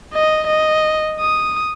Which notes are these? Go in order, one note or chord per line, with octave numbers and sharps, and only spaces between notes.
D#5
D#5
D#6